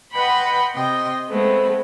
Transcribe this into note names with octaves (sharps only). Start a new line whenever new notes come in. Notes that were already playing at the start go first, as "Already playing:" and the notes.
B4 D#5 F#5 G5 B5 C6
C3 D#5 G5 C6
G#3 A3 B3 C4